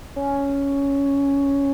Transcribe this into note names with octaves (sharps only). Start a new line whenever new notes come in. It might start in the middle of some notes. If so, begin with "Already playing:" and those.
C#4